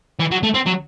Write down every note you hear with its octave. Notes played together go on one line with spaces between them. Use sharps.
E3
F#3
A3
C4
F#3